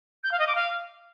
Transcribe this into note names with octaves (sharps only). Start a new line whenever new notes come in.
G6
F5
D#5
D6
F5